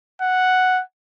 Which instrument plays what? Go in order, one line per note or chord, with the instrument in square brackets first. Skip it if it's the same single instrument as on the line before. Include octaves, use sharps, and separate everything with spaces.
[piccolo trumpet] F#5